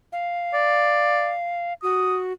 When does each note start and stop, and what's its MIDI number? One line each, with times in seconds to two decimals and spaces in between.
0.12 1.73 77
0.54 1.34 74
1.83 2.33 66
1.83 2.17 87